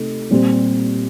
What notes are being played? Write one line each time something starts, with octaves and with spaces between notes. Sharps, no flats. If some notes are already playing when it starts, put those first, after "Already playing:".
Already playing: C3 A3 D#4
A#2 G3 C4